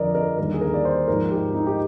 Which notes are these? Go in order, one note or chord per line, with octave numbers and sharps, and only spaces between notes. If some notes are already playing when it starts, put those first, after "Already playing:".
Already playing: F2 D3 F3 A#4 D5 D#5
A#4
D#2 D3 G3 A#4
G#4
A#4
D5
C5
G#2 F3 A#4
G4
D#4
G4